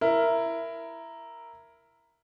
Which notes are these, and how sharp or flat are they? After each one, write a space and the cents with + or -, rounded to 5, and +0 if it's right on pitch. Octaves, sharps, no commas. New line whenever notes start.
E4 +10 A#4 +0